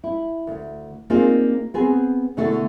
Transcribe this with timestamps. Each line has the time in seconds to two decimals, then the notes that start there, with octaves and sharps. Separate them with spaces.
0.04 E4
0.47 D2
1.10 A#3 C4 D4 D#4 F4 G#4
1.74 B3 C4 G#4
2.37 B2 D3 A3 E4 A4